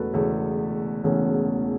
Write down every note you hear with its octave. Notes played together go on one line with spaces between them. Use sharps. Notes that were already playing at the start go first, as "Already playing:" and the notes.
Already playing: E1 E2 C#3 A3 C#4 F#4 A4 B4
E1 E2 C#3 A3 C#4
E1 E2 C#3 A3 C#4